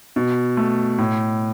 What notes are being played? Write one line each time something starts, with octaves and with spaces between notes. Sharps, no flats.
B2
A3
A2